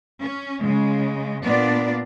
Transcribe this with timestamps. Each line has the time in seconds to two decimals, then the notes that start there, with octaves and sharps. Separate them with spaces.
0.23 C#4
0.63 C#3 G#3
1.44 A#2 A#3 B3 D4 F4 D5